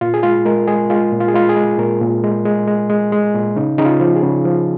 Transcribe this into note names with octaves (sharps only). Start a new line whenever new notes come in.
A#2 F4
G#4
G#3 F4
G#3 A#4
G#3 G#4
G#3 F4
A#2
F4
G#4
G#3 F4
G#4
G#3
A#2 A#4
A#2
G#3
G#3
G#3
G#3
G#3
A#2
C#3 D#4
C#3 D#4
F4
F3
G#4
C#3
F3